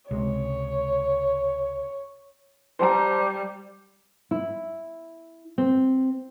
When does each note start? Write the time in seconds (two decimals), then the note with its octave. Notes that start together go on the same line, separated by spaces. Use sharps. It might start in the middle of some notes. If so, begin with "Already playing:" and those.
0.11 C#2 C3 G#3 C#5
2.79 G3 C5 A5 A#5
4.31 E4
5.58 C4